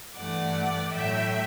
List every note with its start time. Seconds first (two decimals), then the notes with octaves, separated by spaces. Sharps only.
0.16 G2 E3 A3 D5 F#5
0.93 A2 F#3 A3 E5 G5